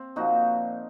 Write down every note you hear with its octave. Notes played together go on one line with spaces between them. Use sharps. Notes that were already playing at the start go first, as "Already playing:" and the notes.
Already playing: C4
A#2 F3 D#4 F#4